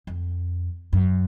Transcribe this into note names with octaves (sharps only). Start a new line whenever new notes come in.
F2
F#2